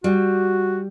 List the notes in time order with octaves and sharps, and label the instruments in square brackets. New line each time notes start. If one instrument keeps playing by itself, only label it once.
[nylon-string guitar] G3 [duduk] F#4